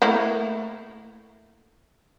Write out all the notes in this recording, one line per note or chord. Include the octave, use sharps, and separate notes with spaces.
A3 A#3 E4